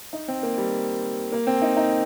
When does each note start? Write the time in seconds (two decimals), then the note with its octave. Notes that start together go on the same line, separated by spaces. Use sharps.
0.13 D#4
0.28 C4
0.43 A#3
0.58 G3
1.32 A#3
1.47 C4
1.62 D#4
1.77 D#4